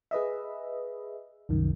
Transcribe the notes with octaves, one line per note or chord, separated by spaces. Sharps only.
G#4 B4 D#5 E5
C2 F#2 D#3